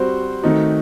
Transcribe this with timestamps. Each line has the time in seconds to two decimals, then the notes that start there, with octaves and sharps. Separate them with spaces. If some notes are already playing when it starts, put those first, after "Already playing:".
Already playing: G3 C4 F#4 C5
0.42 D#3 A3 C4 D#4 F#4